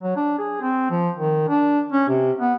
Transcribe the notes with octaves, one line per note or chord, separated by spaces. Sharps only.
F#3
D4
G#4
C4
F3
D#3
D4
C#4
C3
B3